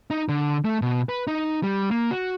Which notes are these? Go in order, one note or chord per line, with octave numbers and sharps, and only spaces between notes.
D#4
D3
A3
B2
B4
D#4
G3
A#3
F#4